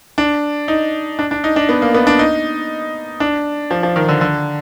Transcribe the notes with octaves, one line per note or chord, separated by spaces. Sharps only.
D4
D#4
D4
D4
D#4
D4
B3
A#3
B3
D4
D#4
D4
F3
F3
D#3
D3
D3